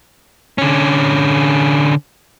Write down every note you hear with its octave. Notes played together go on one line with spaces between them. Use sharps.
D3 C#4